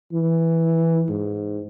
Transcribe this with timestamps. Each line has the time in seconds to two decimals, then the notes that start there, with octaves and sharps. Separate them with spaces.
0.13 E3
1.09 G#2